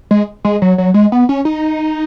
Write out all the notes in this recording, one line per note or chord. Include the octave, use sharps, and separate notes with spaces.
G#3
G#3
F#3
F#3
G#3
B3
C#4
D#4